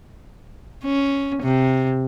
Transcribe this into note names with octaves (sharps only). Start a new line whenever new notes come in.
C#4
C3